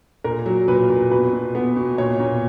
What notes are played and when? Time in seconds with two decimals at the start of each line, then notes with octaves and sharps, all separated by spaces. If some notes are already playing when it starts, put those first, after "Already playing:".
0.24 A#2 A#4
0.46 F#3
0.68 A#2 B4
0.90 A#2
1.11 B2 B4
1.33 B2
1.55 B3
1.76 B2
1.98 A#2 C#5
2.20 A#2